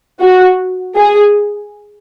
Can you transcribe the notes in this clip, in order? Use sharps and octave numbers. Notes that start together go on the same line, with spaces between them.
F#4
G#4